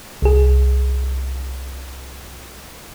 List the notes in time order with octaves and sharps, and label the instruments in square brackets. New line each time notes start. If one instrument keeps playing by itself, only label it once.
[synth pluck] C2 G#4